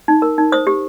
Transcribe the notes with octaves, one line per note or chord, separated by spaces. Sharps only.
D#4
A#4
D#4
C5 D#6
G4